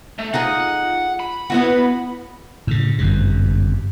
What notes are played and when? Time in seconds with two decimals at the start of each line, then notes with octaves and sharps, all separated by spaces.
0.19 A3
0.34 D#4 F4 G#4 F#5
1.20 B5
1.50 B3 E4 F#4
2.67 A2 C#3
2.98 G1 F#2 C3